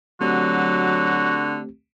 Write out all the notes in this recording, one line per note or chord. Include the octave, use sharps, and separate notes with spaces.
D3 F#3 A3 C4 F#4 G4